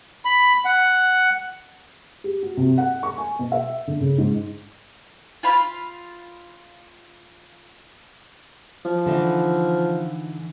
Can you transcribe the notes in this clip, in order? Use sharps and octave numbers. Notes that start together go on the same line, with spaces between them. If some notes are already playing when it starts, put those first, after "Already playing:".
B5
F#5
G4
F#4
C3
F#5
C#6
G#5
B2
E5
D3
C#3
G#2
F4 F5 B5
F3
D3 E3 D#4